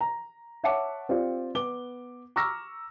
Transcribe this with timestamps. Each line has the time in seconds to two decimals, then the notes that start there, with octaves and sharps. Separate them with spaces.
0.01 A#5
0.64 C#5 E5 F#5 A5 D6 C#7
1.09 C4 F4 G4 D5
1.55 B3 D6 G7
2.36 A#5 C#6 D6 E6 F6 A#6